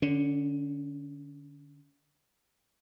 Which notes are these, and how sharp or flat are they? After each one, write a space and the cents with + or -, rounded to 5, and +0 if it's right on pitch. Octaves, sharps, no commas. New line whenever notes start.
D3 +5 C#4 +35